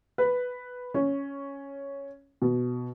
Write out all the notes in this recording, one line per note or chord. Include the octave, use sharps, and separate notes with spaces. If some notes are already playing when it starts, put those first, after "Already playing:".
B4
C#4
B2